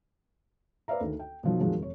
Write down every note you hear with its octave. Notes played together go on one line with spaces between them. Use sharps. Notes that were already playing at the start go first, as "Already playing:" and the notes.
B4 C5 D5 E5 F5 A#5
D2 D#3
G5
B2 D#3 F3 F#3
F2 A#2 D#3 F3 F#3 G#3
F1 C#5